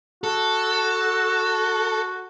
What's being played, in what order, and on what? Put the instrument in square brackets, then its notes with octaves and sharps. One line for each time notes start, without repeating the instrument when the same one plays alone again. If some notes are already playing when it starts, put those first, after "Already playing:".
[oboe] F#4 [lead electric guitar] A4